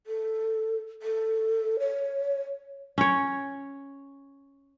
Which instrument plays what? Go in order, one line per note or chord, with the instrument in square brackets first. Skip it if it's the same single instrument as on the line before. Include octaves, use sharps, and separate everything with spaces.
[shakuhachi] A4
A4
C#5
[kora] C#4 C#5